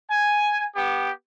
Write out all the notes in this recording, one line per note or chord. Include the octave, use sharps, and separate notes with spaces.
G#5
B3 G4